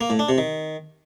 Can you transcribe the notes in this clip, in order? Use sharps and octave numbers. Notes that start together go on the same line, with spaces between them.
A#3
A2
D4
C3
D#3